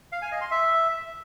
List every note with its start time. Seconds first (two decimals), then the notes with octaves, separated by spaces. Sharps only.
0.12 F5
0.22 G#5
0.32 D#5
0.41 C6
0.51 E5